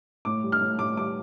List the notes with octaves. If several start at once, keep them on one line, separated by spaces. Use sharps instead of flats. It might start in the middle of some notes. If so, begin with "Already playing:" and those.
A2 D6
G3
F6
A2
A2 D6
G3 D6